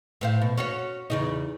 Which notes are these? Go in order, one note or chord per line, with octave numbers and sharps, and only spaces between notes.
A2 C5 F5
B2
C#4 F#4 C#5
E2 C#3 D#4